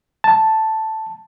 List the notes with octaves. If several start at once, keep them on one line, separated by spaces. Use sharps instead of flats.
A5